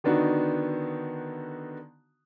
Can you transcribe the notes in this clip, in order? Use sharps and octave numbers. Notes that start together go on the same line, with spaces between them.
D3 D#3 B3 D4 D#4 F#4